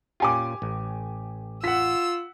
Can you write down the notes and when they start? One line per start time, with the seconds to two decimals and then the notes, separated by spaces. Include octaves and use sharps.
0.20 A#2 C#4 F4 G4 G#5 D6
0.62 A1
1.64 F4 F#5 E6 B6